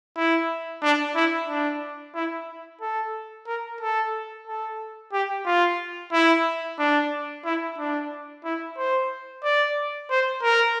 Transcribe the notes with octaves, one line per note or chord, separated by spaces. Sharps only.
E4
D4
E4
D4
E4
A4
A#4
A4
A4
G4
F4
E4
D4
E4
D4
E4
C5
D5
C5
A#4